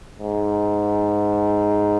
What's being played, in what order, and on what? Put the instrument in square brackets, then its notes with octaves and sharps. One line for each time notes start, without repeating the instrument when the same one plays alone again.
[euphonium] G#2